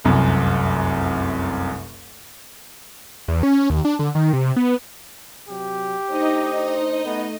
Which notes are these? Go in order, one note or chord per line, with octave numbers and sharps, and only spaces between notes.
F1 C2 F#2
E2
C#4
D#2
D4
D3
D#3
C3
B3
C3 F#3 G4
A3 D4 D#4 C5 D#5
A3 B3